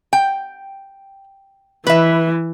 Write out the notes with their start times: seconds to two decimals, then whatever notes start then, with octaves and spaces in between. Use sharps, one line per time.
0.13 G5
1.87 E3 B4 E5